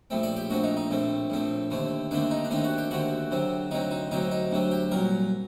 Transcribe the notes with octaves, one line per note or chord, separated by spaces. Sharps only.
A#1 A2 A3 C4
D5
G4
A#1 A2 A3 C4 F#4
D#4
D#4
A#1 A2 A3 C4
A#1 A2 A3 C4
D#2 D3 A3 C4
D#2 D3 A3 C4 D4
D#4
D4
D#2 D3 A3 C4 D#4
F#4
G4
D#2 D3 A3 C4 F#4
D2 C3 F#3 C4
D2 C3 F#3 C4 D#4
D#4
D2 C3 F#3 C4 D#4
D#4
D2 C3 F#3 C4
G4
C2 A#2 F#3 A#4